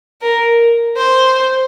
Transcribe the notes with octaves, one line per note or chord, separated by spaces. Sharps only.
A#4
C5